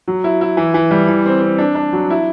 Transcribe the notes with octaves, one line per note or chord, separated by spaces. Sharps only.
F#3
E4
E4
E3
E3
G3
E3
C4
C4
D4
D4
F#3
E4